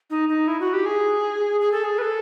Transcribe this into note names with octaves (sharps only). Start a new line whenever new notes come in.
D#4
D#4
E4
F#4
G4
G#4
G#4
A4
G#4
B4
A4